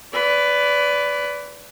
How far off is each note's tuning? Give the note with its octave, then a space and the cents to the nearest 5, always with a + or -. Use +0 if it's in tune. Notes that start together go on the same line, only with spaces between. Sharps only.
B4 +10 D5 -20